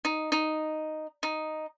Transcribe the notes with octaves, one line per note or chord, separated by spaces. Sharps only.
D#4
D#4
D#4